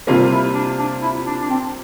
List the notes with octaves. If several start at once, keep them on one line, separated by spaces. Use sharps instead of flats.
C3 G3 A#3 D4 F4
E4
D4
D4
E4
D4
D4
C4